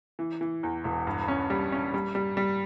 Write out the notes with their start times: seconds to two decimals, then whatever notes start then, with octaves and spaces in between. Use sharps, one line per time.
0.19 E3
0.41 E3
0.63 E2
0.84 E1
1.07 G2
1.28 C#4
1.50 G3
1.72 C#4
1.94 G3
2.15 G3
2.37 G3